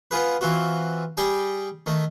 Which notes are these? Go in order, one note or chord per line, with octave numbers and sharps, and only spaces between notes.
B3 F4 G#4 B4
E3 C4 F4 F#4
G3 G#4 G5 G#5
D#3 A3